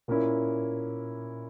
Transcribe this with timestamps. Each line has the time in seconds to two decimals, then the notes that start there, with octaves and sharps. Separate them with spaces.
0.08 A#2 A#3 C#4 E4